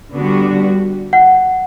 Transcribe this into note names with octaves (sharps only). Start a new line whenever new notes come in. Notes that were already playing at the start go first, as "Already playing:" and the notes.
D3 G3 B3 D4 F#4
F#5